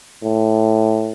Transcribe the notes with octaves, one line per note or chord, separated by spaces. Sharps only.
A2